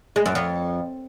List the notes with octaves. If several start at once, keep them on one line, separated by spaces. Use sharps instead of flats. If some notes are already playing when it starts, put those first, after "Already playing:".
G#3
F#2
F2